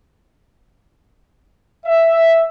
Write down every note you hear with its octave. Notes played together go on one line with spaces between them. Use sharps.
E5